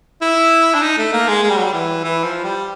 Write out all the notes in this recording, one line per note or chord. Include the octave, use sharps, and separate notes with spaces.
E4
D4
D#4
A3
A#3
G#3
G#3
G3
F#3
G3
E3
E3
F3
G3